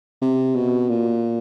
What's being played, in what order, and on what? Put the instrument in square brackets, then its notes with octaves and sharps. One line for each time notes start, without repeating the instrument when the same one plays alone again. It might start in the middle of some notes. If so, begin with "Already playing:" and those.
[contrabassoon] C3
B2
A#2